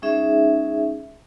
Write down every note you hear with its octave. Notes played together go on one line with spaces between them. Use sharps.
G#3 C#4 D#4 G#4 E5